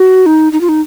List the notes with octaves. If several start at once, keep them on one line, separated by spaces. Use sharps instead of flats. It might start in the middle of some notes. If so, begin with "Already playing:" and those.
Already playing: F#4
D#4
D#4
F4
D#4